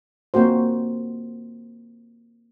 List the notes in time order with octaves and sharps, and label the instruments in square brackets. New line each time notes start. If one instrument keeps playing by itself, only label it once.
[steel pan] A#3 C4 F#4 C5